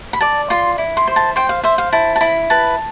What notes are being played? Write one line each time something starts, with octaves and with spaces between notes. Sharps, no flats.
B5
D5 A5
F4 C6
E4
C6
C5
A5
C5 G5
F5
C5 E5
F5
E4 A5
A5
E4 B5
B4 A5